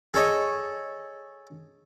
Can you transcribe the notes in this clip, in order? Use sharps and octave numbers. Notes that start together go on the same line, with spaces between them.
G#4 A4 C#5 D#5